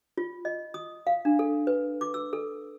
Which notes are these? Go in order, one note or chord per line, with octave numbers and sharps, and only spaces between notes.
F4
D#5
D#6
F5
D4
A4
B4
D6
E6
A4